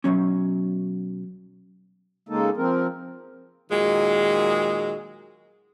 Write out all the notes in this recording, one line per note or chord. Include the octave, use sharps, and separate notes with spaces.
B1 G#2 F#3 C#4
C#3 G#3 A#3 D#4 A4
F3 C4 A#4
A#2 D#3 F#3 G#3